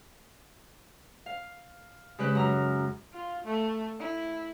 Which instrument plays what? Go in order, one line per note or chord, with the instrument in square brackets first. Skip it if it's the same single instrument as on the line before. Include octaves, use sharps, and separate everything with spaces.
[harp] F5
C#3 G#3 G4 B4 F#6
F#2 A#5 F6
[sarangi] F4
A3
E4